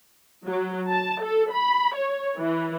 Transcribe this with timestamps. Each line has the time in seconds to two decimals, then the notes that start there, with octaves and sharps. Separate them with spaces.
0.45 F#3
0.91 A5
1.23 A4
1.53 B5
1.95 C#5
2.37 E3